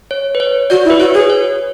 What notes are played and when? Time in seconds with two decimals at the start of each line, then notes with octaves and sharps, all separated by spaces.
0.11 C#5
0.35 B4
0.40 C#5
0.70 F#4 D5
0.85 E4
0.90 B4
1.00 F#4 C#5
1.14 G#4
1.20 B4
1.30 C#5